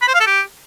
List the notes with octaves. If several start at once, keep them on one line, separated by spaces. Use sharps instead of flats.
B5
C5
F5
A4
G4